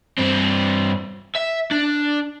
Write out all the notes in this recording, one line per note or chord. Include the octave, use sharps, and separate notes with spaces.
G2 C4
E5
D4